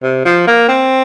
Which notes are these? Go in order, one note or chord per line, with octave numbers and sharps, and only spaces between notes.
C3
F3
A#3
C4